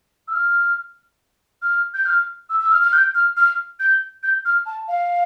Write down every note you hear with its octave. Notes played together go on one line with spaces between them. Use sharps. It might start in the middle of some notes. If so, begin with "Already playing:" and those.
E6
F6
F6
G6
F6
E6
E6
F6
F6
G6
F6
F6
G6
G6
F6
A5
F5